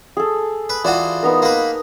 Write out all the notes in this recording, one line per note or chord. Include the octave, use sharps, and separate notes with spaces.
G#4 A4
B4
E3 F4 F#4 D5
B3 D#4 A#4
A#3 B4 A#5